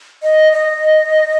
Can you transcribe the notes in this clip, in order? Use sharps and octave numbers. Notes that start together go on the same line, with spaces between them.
D#5
D#5